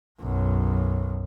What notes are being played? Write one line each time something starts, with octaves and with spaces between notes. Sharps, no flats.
B1 F#2